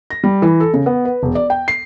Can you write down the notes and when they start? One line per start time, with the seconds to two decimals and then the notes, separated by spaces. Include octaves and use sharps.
0.10 A#6
0.24 G3
0.42 E3
0.60 A4
0.74 C#3
0.86 B3
1.05 B4
1.23 E1
1.35 D5
1.50 G5
1.68 C7